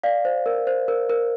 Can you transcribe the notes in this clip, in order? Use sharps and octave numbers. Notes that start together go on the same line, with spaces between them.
D5 F5
C5
A#4
C5
A#4
A#4